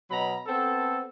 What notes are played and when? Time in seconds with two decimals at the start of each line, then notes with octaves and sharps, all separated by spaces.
0.11 B2 F#3 A#5 B5
0.46 B3 C4 A4